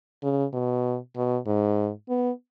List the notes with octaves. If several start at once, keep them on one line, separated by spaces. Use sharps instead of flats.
C#3
B2
B2
G#2
B3